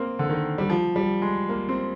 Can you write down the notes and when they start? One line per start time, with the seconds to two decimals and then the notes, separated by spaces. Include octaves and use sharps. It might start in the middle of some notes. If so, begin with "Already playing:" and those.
Already playing: A#3 C4
0.19 D3
0.30 D#3
0.58 G3
0.70 F3
0.96 G3
1.22 G#3
1.49 A#3
1.69 C4